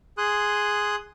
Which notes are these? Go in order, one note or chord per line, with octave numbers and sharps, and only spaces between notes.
G#4 C6 D#6 F#6